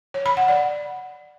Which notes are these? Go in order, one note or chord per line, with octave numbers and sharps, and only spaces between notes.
C#5
B5
F#5
D5